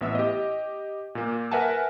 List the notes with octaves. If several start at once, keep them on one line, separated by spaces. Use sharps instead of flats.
A1 B3 E5 E6
G4 D#5
A#2 A#3
A#4 B4 E5 F#5 G#5 A5